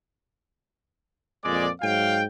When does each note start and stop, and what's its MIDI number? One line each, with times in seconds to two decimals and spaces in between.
1.44 1.68 41
1.44 1.68 46
1.44 1.68 56
1.44 1.68 74
1.81 2.23 44
1.81 2.23 54
1.81 2.23 77
1.81 2.23 79